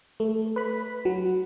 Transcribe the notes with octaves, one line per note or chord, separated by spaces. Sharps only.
A3
B4 B5
F#3